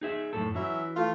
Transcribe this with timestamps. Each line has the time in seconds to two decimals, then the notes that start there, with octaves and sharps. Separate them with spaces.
0.01 D#4 G#4 E5
0.33 F#2 A2 A4
0.54 E3 F#3 C#4 E5
0.96 A3 F4